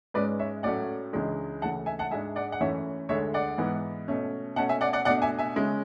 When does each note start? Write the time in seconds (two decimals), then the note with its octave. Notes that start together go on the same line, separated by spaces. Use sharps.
0.14 G#2 G#3 C#4 B4 D5
0.39 C#5 E5
0.63 A2 F#3 A3 C#4 D5 F#5
1.13 C#2 C#3 E3 G#3 D4
1.62 D2 C#3 E3 A3 F#5 A5
1.86 E5 G#5
1.99 F#5 A5
2.11 G#2 G#3 D4 E5 G#5
2.36 D5 F#5
2.52 F#5
2.61 F#2 E3 A3 C#4 C#5 E5
3.09 D2 D3 G#3 C#5 E5
3.34 D5 F#5
3.58 G#2 E3 B3
4.08 B2 A3 C#4
4.56 B2 A3 C#4 F#5 A5
4.69 E5 G#5
4.81 D5 F#5
4.93 D5 F#5
5.05 B2 A3 D4 D5 F#5
5.22 E5 G#5
5.39 E5 G#5
5.56 C#3 G#3 C#4